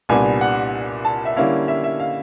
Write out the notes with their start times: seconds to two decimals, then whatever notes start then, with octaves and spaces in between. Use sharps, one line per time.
0.09 C2 A#2 G3 B3 D4 G#5
0.41 F#5
1.05 A5
1.25 E5
1.37 D3 G3 A#3 C#4 E4 F5
1.68 E5
1.84 E5
2.00 F5